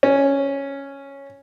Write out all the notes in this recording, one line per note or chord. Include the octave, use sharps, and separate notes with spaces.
C#4